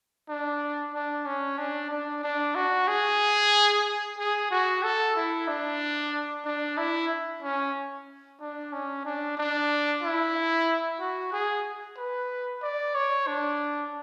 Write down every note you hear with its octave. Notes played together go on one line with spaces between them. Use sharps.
D4
D4
C#4
D4
D4
D4
F#4
G#4
G#4
F#4
A4
E4
D4
D4
E4
C#4
D4
C#4
D4
D4
E4
F#4
G#4
B4
D5
C#5
D4